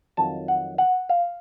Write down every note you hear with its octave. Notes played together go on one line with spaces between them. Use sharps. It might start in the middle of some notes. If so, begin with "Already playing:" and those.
F2 D#3 F#3 A5
F#5
F#5
F5